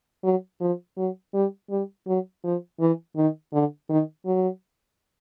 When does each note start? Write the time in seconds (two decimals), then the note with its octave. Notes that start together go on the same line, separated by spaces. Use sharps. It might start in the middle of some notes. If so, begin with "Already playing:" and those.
0.24 F#3
0.61 F3
0.98 F#3
1.34 G3
1.70 G3
2.07 F#3
2.44 F3
2.80 E3
3.16 D#3
3.53 D3
3.89 D#3
4.26 F#3